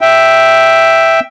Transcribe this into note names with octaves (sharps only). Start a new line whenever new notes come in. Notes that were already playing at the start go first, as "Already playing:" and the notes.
E5 G5